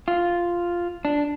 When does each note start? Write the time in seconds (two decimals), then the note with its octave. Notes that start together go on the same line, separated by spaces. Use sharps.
0.08 F4
1.05 D4